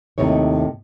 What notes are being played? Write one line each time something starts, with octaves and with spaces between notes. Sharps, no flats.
D#2 A2 C3 D#4 C#5